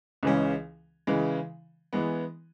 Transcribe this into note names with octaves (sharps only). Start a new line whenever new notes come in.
C#2 C#3 E3 G#3 C#4
C#3 E3 G#3
E3 G#3 B3